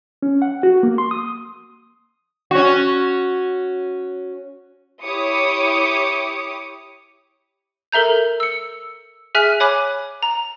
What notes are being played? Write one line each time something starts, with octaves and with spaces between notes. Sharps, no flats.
C#4
F#5
F#4
A#3
C6
D#6
C#4 F#4
E4 G4 C#5 D6 D#6 C#7
A4 A#4 E5 A#5 G6
E6 C#7
G#4 E5 G#5 F6 F#6 B6
C#5 G#5 B5 D6 F#6
A#5